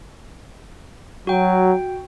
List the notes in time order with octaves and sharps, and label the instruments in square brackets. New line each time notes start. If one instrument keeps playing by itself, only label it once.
[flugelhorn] F#3 [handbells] F#4 G5